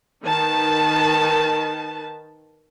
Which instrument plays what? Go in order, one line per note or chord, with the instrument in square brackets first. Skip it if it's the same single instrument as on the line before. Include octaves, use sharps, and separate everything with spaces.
[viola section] D#3 D#4 B4 A5